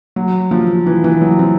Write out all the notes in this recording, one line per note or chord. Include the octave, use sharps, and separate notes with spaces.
F#3
F3
E3
E3
F#3
C4